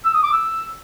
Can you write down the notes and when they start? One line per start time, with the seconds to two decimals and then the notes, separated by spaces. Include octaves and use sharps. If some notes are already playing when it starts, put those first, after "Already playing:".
0.05 E6
0.14 D#6
0.23 D6
0.33 E6